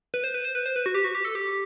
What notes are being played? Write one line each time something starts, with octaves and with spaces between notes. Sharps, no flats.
B4
C5
B4
C5
B4
C5
B4
F#4
G4
F#4
G4
A4
G4